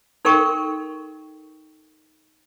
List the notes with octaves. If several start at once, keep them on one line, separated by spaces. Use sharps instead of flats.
D#4 A4 A#4 G5 C#6